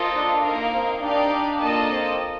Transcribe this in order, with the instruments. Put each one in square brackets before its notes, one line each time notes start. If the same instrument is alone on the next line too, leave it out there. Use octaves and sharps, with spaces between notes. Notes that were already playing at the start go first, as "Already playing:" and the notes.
Already playing: [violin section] A#3 F4 A4 C5 D#5
[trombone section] D4
[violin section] A#3 D#4 A#4 F5
[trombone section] C4
[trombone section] D4 [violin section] D#4 G4 D5 F5
[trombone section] D4
[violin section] A#3 F4 A4 D#5 A5 [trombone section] D4
[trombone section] C4